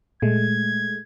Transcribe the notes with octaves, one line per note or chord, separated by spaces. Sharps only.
A#2 G#3 A3 G#6